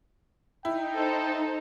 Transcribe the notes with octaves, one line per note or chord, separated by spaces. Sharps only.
D#4 E4 G5
A4 C5 A#5